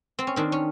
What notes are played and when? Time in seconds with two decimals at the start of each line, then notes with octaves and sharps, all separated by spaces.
0.19 C4
0.27 C#4
0.36 D#3 C4 D4
0.52 C#4